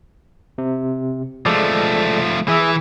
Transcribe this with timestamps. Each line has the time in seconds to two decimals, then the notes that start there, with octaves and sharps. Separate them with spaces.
0.58 C3
1.46 F3 G#3 A3 A4 D5
2.48 E3 G#4 E5 E6